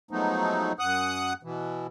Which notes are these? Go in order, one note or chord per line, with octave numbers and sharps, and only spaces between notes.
F3 F#3 G#3 A3 B3 D#4
F#2 F#5 D#6 F#6
B2 E3